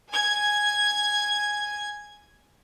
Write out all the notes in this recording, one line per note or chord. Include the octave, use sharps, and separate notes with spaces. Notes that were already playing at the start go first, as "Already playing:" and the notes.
G#5 G#6